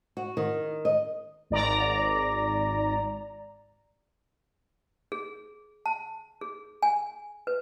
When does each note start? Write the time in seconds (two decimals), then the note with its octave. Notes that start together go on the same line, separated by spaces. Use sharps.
0.17 F#4
0.37 D#3
0.85 D#5
1.50 G#1 D5 A#5
5.12 G#4
5.86 A5
6.41 G#4
6.83 G#5
7.47 B4